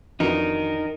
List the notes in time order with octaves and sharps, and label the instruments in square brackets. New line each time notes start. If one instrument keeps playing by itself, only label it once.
[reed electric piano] F2 E3 F6 [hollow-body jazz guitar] D4 F#4 D#5 [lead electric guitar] D#4 A#4